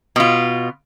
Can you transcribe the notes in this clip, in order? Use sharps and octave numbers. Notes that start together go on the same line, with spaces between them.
B2 F4